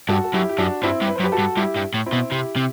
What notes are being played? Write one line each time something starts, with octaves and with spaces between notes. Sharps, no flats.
G2 F#4 A4
A4
F#2 E4 G4
G4
F#2 D4 F#4
G2 C4 E4
G2
B4
C5
F#2
G4 B4
F#4 A4
G2
G2 E4 G4
G2
A2
C4 E4
B2
C3 E4 G4
C3